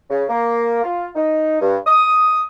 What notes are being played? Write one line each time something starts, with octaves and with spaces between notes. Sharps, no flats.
C#3
A#3
F4
D#4
G2
D#6